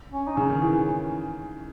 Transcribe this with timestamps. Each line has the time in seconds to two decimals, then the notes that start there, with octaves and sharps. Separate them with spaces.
0.12 C#4
0.27 D#4
0.37 C#3 C#4
0.50 D#3
0.62 E3